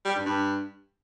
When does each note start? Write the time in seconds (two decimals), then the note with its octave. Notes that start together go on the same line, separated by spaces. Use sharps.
0.05 G3
0.15 G2
0.25 G2